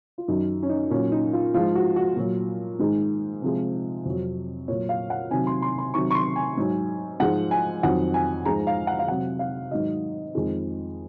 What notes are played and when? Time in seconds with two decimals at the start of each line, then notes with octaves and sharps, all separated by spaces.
0.18 F4
0.28 F#2 D#3 F#3 D#4
0.63 C#4
0.69 D#4
0.90 A#2 F#3 C#4
1.12 D#4
1.33 F4
1.54 G#2 F3 G#3 F4
1.75 F#4
1.96 F#4
2.16 A#2 F#3
2.79 G#2 D#3 G#3
3.42 C3 F3 G#3
4.05 F2 C3 F#3
4.68 A#2 F#3 C#5
4.89 F5
5.10 F#5
5.31 C3 D#3 F#3 G#5
5.47 C6
5.62 C6
5.78 C6
5.94 C3 D#3 F#3 C#6
6.11 C#6
6.15 C6
6.36 G#5
6.57 G#2 F#3
7.20 G#2 F3 G#3 F#5
7.51 G#5
7.83 F2 D#3 F#3 F#5
8.14 G#5
8.45 G#2 F3 G#3 A#5
8.67 F5
8.87 F#5
8.99 F5
9.08 C3 F#3 F#5
9.39 F5
9.71 G#2 D#3 F#3 D#5
10.35 F2 D#3 G#3